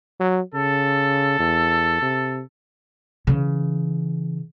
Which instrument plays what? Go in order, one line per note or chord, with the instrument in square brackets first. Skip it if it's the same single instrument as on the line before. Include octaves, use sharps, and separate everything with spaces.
[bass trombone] F#3
[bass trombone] C#3 [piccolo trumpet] A4
[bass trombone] E2
C3
[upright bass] C#3 E3